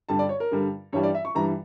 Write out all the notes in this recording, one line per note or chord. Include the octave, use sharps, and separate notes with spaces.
G2 D3 G3 A5
D5
C#5
A#4
G2 D3 G3
G2 E3 G3 C#5
D5
E5
C#6
G2 E3 G3 A#5